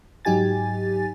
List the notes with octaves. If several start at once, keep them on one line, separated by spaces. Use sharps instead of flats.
G#2 F#3 D#4 G4 G#5 A6